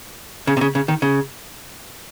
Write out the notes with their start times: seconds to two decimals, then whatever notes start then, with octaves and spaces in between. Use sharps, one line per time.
0.47 C#3
0.57 C3
0.61 C#3
0.75 C#3
0.88 D#3
1.02 C#3